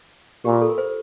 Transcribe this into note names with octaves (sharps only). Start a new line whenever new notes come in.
A#2 G4
F4
A4
A#4
C5